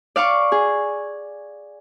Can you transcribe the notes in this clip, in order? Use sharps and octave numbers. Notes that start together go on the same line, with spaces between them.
D5 F5 C#6 D6
G#4